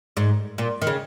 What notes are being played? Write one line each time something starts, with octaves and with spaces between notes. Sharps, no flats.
G#2
A#2
D#3
C#3